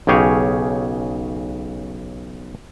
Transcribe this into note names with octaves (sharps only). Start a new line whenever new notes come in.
B1 C#3 G4 G#4 C#5